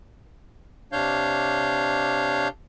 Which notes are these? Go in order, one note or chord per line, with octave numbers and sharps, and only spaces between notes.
C3 D4 C#5 F5 G6